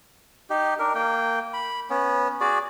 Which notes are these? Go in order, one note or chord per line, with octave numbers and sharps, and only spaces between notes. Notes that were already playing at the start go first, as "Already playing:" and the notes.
D#4 G4
D4 A#4
A#3 G5
B5
B3 C#4
F#4 G#4 D5